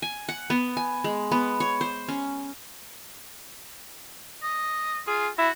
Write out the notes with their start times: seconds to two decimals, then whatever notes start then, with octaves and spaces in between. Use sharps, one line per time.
0.02 G#5
0.29 F#5
0.50 B3
0.77 G#5
1.04 G#3
1.32 B3
1.60 C#5
1.81 C5
2.09 C#4
4.42 D#5
5.07 F4 G#4
5.38 E4 F#4